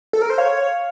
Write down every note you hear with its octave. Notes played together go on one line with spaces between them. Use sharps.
A4
A#4
C5
C#5 F5